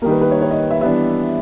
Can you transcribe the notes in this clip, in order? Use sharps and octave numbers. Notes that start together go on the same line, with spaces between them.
D#3 G3 A#3 A#4
B4
B4
C#5
C#5
D#5
E5
E3 G3 B3 D4 E5